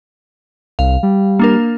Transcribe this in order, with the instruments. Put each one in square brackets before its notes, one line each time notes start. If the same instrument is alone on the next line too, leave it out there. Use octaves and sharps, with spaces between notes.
[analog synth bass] C2 [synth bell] F5
[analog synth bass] G3
[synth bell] A#3 D4 A#4